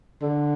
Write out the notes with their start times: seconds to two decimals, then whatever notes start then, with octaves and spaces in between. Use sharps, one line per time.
0.22 D3